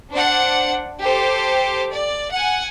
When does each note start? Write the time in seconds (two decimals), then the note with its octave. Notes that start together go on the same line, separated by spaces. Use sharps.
0.11 D4 C5 D5 F#5
1.00 G4 A4 C5 D6
1.91 D5
2.32 F#5 G#5